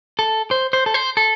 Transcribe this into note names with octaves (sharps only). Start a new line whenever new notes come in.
A4
C5
C5
A4
C5
A4